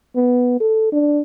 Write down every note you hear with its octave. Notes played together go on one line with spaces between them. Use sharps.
B3
A4
D4